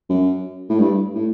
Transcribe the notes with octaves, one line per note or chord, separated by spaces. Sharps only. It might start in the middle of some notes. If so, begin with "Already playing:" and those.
F#2
A2
G2
A2